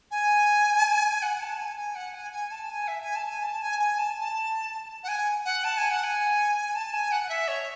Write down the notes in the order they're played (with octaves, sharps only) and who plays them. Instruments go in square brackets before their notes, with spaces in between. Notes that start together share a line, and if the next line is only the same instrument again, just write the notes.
[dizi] G#5
F#5
A5
G#5
G#5
F#5
G#5
G#5
A5
G#5
E5
G#5
A5
G#5
A5
G#5
G#5
A5
A5
F#5
G#5
F#5
A5
G#5
F#5
G#5
A5
G#5
F#5
F#5
E5
C#5